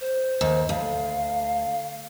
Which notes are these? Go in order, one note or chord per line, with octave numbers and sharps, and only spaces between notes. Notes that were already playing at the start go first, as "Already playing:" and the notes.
C5
D#2
D2 F5